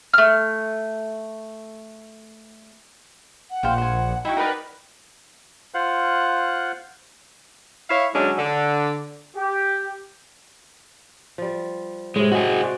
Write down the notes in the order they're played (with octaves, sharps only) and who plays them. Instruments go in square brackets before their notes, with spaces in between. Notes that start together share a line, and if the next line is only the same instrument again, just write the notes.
[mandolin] A3 F6
[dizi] F#5
[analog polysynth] A#1 [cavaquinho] C5 F5 G5
[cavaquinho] C5 G#5
[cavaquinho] D#4 [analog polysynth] E4 F#4 [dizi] G5
[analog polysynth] D#4 A#4 B4 [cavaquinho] F#4 D5
[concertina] F4 C5 F5 F#5 F#6
[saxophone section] E4 C#5 F5
D3 F#3 G#3 C#4 D4
D3
[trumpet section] G4
[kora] F3 G3
[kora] A2 C3 [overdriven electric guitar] G#3
[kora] G#3 [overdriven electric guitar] F#4 G#4
[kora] F#4 C5 D5